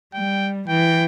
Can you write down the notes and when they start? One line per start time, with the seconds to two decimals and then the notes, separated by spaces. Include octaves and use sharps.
0.14 G3 G5
0.68 E3 G5